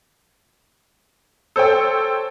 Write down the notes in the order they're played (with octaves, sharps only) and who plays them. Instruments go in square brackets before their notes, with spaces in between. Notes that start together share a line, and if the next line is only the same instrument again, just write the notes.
[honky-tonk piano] A4 C5 C#5 G5